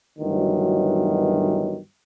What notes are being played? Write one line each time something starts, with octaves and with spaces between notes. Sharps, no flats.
D2 G2 B2 D#3 E3 F#3